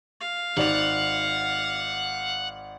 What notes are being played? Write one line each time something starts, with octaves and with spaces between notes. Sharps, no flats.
F5
G#1 D5 F#5 F7